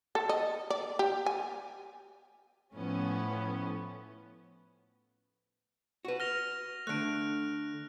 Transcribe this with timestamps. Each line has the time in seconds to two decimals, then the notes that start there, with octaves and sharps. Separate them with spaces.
0.15 A4
0.29 D#5
0.70 D5
0.99 G4
1.26 G#5
2.75 A2 F3 B3 C#4
6.05 F#4 B4
6.20 F6 A#6 F7
6.87 D3 A3 F#6 D7